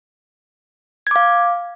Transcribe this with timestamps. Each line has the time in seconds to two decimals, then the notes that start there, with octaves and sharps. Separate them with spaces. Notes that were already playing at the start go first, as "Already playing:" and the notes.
1.07 G#6
1.11 D6
1.16 F5